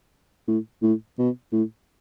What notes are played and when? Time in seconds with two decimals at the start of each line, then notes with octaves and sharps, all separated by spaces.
0.48 A2
0.82 A2
1.18 B2
1.52 A2